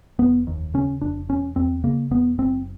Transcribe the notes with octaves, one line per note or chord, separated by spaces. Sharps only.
F1 B3
D#2
C#3 C#4
F1 D4
E1 C#4
E2 C4
C#3 A#3
E1 B3
F#1 C4